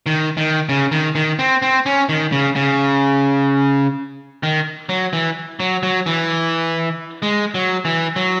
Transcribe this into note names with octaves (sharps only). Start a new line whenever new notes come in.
D#3
D#3
C#3
D#3
D#3
C4
C4
C#4
D#3
C#3
C#3
D#3
F#3
E3
F#3
F#3
E3
G#3
F#3
E3
F#3